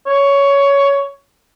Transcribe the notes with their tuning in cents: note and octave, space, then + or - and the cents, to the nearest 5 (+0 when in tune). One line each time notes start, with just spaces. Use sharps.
C#5 +15